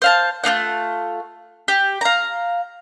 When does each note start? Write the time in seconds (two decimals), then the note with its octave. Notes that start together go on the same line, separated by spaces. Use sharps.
0.02 C5 F5 A5
0.44 A3 A#3 F4 F#5
1.68 G4
2.01 F5 A#5